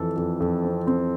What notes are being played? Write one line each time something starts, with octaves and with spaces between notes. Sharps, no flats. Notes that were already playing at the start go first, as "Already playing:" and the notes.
Already playing: F2 E3 A4
F2
F2
C4
C4